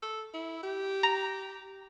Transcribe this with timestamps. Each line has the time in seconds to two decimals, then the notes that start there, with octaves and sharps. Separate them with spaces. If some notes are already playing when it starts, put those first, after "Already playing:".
0.02 A4
0.34 E4
0.63 G4
1.03 A#5